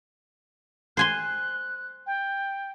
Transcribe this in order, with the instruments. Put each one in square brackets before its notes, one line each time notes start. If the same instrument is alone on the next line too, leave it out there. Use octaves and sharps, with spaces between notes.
[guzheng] C5 G#5 C6 [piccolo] F#6
[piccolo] G5